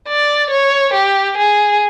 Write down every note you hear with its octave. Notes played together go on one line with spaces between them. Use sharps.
D5
C#5
G4
G#4